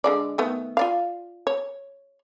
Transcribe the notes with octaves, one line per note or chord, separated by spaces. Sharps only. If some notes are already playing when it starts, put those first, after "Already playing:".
D3 G#3 D5
D#3 A3 B3
F4 D5 F5
C#5